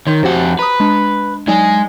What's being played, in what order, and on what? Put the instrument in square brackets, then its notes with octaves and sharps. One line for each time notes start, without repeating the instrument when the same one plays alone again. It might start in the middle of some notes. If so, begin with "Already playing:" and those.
[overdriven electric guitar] D#3 [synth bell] C#5 C6 G6
[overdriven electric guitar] F2 F#5 [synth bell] F#4 G4 C5
[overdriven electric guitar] B4 [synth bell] A#5 D#6
[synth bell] G#3 D4
[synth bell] F#3 D#4 D5 [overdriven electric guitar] G#3 G#4